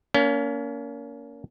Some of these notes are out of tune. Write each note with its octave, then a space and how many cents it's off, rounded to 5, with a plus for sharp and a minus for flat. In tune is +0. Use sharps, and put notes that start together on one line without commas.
A#3 +0 C#4 +35